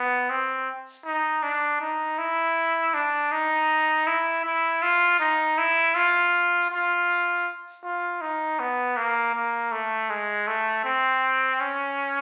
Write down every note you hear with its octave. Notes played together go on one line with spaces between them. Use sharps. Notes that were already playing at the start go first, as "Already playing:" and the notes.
Already playing: B3
C4
D#4
D4
D#4
E4
D4
D#4
E4
E4
F4
D#4
E4
F4
F4
F4
D#4
B3
A#3
A#3
A3
G#3
A3
C4
C#4